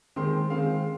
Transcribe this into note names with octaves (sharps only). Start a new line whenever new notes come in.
D#3 G#3 C4 C6
D#3 G#3 C4 F5